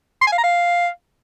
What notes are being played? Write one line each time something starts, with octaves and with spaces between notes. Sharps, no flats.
C6
G#5
F5
A#5
F5